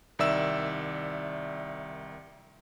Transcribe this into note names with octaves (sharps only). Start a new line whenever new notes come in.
C2 D#3 D5 E5 E6 E7